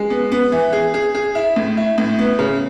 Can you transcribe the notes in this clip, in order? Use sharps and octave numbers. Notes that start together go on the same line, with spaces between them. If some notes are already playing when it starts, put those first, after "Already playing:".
Already playing: G#3
B3
B3
E3
G#4
G#4
G#4
E4
A2
E4
A2
B3
C#3